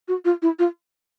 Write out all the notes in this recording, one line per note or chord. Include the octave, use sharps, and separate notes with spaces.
F#4
F4
E4
F4